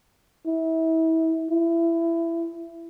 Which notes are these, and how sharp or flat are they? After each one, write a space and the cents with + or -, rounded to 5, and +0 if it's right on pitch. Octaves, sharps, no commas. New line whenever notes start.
E4 -30
E4 +20